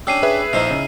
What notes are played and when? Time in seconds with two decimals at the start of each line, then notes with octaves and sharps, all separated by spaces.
0.07 C#4 D4 G4 E6 C7 D#7
0.23 G#4 B4 E5
0.53 A#1 D#4 E4 C5 D#5 F5
0.70 C#3